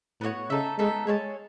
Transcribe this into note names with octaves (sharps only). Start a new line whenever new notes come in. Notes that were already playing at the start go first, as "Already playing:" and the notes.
A2 B3 D#4 F#4 C#5
C#3 D#4 A4 E5
G#3 B3 D#4 A4 E5
G#3 G#4 C#5 E5 A5